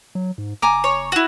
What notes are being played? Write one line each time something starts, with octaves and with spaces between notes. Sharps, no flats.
F#3
G#2
F#1 G#5 A#5 D6
C#5
E4 F#4